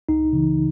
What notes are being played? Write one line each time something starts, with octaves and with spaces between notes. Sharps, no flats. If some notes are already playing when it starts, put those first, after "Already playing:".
C#2 D#4
C#3 E3